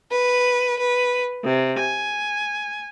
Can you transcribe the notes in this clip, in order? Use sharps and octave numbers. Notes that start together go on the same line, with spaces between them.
B4
B4
C3
G#5